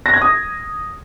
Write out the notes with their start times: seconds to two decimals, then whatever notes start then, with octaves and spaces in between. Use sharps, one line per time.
0.06 A#6
0.14 G#6
0.21 D#6